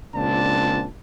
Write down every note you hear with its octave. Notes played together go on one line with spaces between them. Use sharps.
C#2 A#2 C4 D4 A5